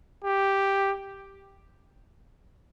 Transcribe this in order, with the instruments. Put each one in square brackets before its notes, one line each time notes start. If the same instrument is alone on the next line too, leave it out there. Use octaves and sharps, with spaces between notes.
[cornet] G4